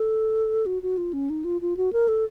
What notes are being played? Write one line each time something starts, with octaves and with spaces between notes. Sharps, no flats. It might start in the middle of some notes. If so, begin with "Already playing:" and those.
Already playing: A4
F#4
F#4
F4
C#4
D#4
F4
F4
F#4
A#4
A4